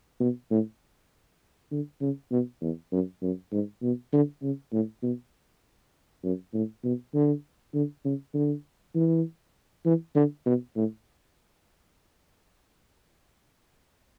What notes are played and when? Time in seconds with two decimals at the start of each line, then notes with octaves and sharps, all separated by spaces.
0.20 B2
0.51 A2
1.71 D3
2.01 C#3
2.31 B2
2.62 E2
2.92 F#2
3.22 F#2
3.52 G#2
3.82 B2
4.13 D3
4.43 C#3
4.73 A2
5.03 B2
6.24 F#2
6.54 A2
6.84 B2
7.14 D3
7.74 D3
8.05 C#3
8.34 D3
8.95 E3
9.85 E3
10.15 D3
10.46 B2
10.76 A2